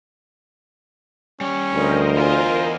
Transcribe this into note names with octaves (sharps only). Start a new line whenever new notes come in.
G3 C#4 C#5
D2 A#4 C5 D#5
E2 F4 G#5